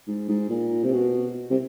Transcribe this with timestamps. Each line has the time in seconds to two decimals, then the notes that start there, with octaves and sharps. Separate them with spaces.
0.07 G#2
0.29 G#2
0.49 A#2
0.84 C3
0.93 B2
1.50 C3